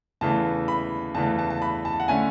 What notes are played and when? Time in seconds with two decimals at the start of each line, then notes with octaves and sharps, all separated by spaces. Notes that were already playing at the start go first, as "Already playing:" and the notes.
0.21 E2 C#3 E3 A3 A5
0.68 B5
1.15 E2 C#3 E3 A3 A5
1.39 A5
1.50 A5
1.62 B5
1.85 A5
2.00 F#5
2.08 D3 A3 C#4 G#5